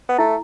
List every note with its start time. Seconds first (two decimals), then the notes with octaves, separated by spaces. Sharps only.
0.09 B3
0.18 A3 E4